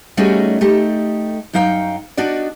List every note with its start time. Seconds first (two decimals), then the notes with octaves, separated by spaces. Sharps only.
0.17 G3 A3 C#4 D#4 F#4 G#4
0.61 A3 D#4 G4 A4
1.53 F#2 F#3 D#4 F5 G5
2.17 D4 D#4 F#4 D5